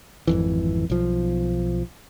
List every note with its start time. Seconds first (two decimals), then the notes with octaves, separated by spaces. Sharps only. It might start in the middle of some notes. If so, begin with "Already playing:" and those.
0.27 G#1 F2 E3
0.90 B1 F3